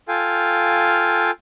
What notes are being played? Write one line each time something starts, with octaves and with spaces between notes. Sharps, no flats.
F4 A4 F5 G5 G#5